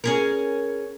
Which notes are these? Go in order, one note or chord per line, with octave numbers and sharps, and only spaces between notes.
C#4 G#4 A#4